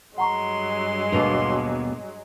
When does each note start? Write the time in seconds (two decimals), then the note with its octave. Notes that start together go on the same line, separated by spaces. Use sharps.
0.18 G2 F#3 G#3 F#5 A#5 C6 C#6
1.12 D#2 B2 A#3 D4 B4 F7